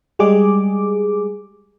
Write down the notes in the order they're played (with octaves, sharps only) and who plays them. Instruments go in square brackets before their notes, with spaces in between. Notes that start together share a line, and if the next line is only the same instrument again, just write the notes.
[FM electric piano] G3 G#3 G#4 D6